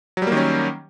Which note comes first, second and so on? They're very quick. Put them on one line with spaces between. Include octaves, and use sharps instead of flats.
F#3 G3 A#3 D#3 C#4